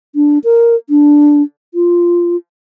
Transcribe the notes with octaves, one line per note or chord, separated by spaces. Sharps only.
D4
A#4
D4
F4